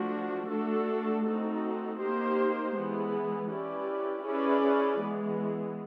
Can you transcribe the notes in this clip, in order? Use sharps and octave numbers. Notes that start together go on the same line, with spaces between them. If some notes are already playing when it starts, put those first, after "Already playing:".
Already playing: F3 A3 D4 F#4
A3 D4 F#4 A4
A3 C4 D#4 F#4 A4
A#3 D#4 G4 C5
E3 G#3 B3
C#4 E4 G4 B4 D5
C#4 E4 G#4 B4 D5
E3 G#3 B3